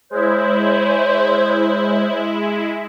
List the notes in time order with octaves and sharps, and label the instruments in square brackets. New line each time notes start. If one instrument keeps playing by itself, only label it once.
[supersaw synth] G#3 E4 [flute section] C5 C#5 G6